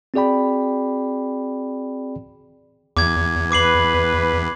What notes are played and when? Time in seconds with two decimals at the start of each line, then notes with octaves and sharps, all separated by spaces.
0.14 C4 F#4 G#4 D5 G5 B5
2.97 E2 D6 G#6
3.52 B4 D6 C7 F#7